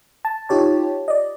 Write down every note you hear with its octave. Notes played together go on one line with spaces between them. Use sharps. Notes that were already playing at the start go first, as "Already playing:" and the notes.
A5
D#4 F4 G4 C#5 A5
D5 D#5